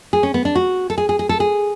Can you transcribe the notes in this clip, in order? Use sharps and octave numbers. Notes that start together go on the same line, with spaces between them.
G#4
C#4
B3
D4
F#4
A4
G#4
G#4
G#4
A4
G#4